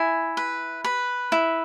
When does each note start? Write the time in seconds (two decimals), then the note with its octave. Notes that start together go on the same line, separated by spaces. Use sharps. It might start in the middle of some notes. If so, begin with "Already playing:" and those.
Already playing: E4 G#5
0.37 B4
0.84 B4
1.32 E4